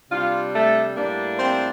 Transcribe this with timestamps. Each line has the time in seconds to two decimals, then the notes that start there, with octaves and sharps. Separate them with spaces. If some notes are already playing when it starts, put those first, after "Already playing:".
0.10 C3 G3 D4 F4
0.53 A3 A4
0.96 A2 G3 A#3 D4
1.39 C4 C5